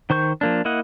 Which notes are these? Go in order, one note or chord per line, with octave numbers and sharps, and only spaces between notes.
D#3 C5 C#6 G6
F3 A#3 D4
A#3 E4 D#5 F#5